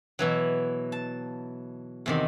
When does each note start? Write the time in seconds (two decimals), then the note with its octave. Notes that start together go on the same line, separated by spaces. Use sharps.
0.19 B2 E3 F#3
0.92 A5
2.06 E2 C3 D#3